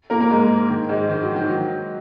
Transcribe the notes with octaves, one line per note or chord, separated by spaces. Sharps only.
A#3 A#4
A#3 A#4
G#2 G#3
D#3
G#2 G#3
D#3
F#3
D#3
F#3